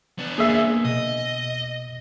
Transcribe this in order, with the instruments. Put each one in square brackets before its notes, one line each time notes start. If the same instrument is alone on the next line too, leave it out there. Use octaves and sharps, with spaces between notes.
[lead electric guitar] B3 D4
[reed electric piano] A#3 [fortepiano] G#4 E5
[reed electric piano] B2 [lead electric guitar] D#5